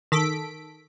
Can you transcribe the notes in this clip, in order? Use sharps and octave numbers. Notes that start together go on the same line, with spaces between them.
D#3 A4 B6 D7